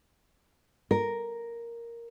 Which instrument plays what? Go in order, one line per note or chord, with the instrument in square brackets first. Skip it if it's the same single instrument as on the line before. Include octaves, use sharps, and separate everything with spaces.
[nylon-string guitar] A#4